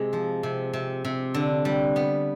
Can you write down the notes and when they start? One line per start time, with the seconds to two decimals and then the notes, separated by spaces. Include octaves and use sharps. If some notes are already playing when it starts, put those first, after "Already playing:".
Already playing: C3 G#3
0.13 F3
0.43 C3
0.73 C3
1.05 C3
1.34 D3
1.65 G3
1.96 B3